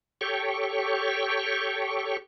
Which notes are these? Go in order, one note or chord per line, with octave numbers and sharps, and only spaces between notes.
G4 A4 C#5 G5 C#6